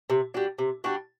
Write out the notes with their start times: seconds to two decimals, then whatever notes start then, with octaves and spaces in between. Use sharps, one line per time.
0.10 C3
0.34 G3 D4 F#4
0.59 C3
0.84 G3 D4 F#4